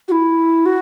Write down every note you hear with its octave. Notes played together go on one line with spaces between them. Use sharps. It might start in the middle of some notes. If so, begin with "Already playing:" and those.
F#4
E4
F#4